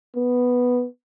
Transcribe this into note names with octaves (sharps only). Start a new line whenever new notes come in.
B3